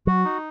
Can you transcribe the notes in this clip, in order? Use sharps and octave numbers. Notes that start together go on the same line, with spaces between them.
F#3 F#4
D#4